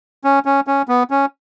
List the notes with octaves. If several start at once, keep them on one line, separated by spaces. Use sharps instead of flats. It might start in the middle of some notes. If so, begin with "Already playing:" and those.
C#4
C#4
C#4
B3
C#4